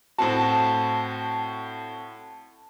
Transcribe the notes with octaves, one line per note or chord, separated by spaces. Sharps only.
A2 C4 F#4 A5